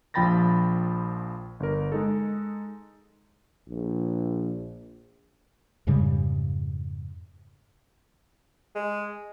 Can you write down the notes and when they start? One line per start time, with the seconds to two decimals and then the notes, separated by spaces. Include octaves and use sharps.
0.14 A#1 F3 G5 B5 A6 A#6
1.60 G1 A#4
1.92 G#3 D#4 A4
3.69 A#1
5.87 F2 G#2 C#3 G3
8.75 G#3